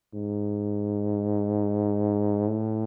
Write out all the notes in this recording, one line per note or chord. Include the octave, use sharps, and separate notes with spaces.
G#2
A2